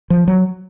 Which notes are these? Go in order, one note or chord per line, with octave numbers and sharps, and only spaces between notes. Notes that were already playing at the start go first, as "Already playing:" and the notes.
F3
F#3